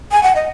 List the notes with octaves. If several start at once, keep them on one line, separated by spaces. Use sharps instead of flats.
G#5
F#5
D#5